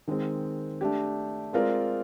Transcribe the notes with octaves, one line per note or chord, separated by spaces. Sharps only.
D#3 G#3 C4
A3 D4 G4
G#3 C4 F4 A#4 D5